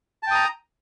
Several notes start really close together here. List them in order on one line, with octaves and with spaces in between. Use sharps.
A5 G5 D#6 A#5